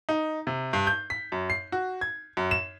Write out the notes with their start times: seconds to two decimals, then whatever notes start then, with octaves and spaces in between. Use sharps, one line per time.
0.09 D#4
0.47 C3
0.73 G2
0.87 G6
1.10 B6
1.32 F#2
1.50 C7
1.72 F#4
2.01 G#6
2.37 F#2
2.51 E7